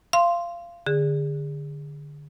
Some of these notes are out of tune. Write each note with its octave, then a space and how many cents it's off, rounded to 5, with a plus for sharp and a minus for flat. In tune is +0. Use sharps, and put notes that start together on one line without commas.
F5 -20 C6 +0
D3 +0 G#4 -25